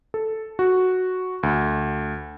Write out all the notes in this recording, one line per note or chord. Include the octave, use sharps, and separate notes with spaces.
A4
F#4
D2